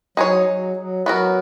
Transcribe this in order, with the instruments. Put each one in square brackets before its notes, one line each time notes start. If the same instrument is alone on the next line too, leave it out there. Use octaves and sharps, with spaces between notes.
[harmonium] F#3 [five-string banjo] D#4 G#4 C#5
[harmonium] F#3
F#3
[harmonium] F#3 [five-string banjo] B3 F#4 A#4